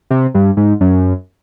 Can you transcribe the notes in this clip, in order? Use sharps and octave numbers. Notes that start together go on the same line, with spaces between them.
C3
G2
G#2
F#2